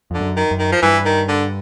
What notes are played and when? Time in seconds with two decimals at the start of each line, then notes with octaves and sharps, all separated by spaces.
0.11 F2 D3
0.20 F#2
0.36 D#3
0.51 F#2
0.59 D#3
0.72 F3
0.82 G2 E3
1.05 D#3
1.28 D3